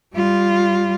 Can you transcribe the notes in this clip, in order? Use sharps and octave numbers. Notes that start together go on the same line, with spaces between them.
G3 F4